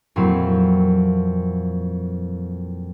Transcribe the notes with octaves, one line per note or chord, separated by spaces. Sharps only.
F2 A#2 F#3 C4 E4